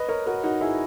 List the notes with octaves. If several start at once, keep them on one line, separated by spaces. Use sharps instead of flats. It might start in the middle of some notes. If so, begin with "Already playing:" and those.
Already playing: B4 D#5
A#4 C#5
F#4 A#4
D#4 F#4
E4 G#4